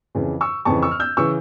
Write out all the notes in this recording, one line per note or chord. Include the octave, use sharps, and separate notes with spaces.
F2 C#3 E3
C#6 E6
F2 C#3 E3 A5 C#6
C#6 E6
F6
E6 G6
C#3 E3 C#6 E6